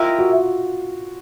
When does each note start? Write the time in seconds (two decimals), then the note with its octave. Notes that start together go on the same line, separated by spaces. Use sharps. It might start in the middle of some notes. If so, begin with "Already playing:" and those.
Already playing: E4 F4 G4 A#4 D#5
0.19 F#4